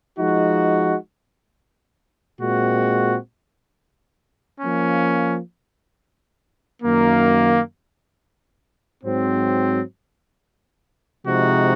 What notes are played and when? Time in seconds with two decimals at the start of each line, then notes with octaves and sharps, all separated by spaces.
0.18 F3 G#3 D#4 F#4
2.39 A#2 G#3 C4 F#4
4.61 F3 A#3 C#4
6.82 F#2 D#3 A#3
9.04 G#2 F#3 C4
11.25 C3 F3 G#3 D#4 F#4